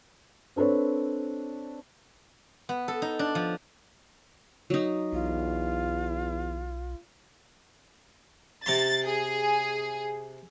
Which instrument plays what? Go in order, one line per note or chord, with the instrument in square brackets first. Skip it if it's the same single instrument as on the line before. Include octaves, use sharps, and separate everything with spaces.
[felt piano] C4 D4 A4 B4 C#5
[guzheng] B3
A4
D#4
D4
F3
[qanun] F#3 D#4
[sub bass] B1 [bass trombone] E2 [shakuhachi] F4
[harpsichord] C3 A#5 C6 [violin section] A6
[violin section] G#4